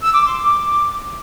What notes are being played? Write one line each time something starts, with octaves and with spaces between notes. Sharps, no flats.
E6
D6
C6
D6